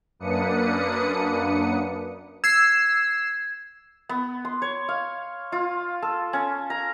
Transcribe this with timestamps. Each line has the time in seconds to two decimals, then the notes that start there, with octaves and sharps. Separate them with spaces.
0.19 F#2 A#3 D4 B4 D#6 C#7
2.44 E6 G#6 C7
4.09 B3
4.45 C6
4.62 C#5
4.89 F5
5.52 F4
6.02 A4
6.33 C#4
6.70 A#5